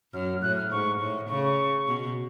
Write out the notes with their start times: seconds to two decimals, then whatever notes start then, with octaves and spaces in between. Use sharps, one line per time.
0.13 F#2 F6
0.42 A2 F#6
0.57 F6
0.71 G#2 C#6
1.00 A2
1.29 C#3 C#6
1.44 C#6
1.87 B2